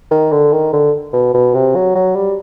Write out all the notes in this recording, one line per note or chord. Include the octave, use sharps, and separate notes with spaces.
D#3
D3
D#3
D3
B2
B2
C3
F#3
F#3
G3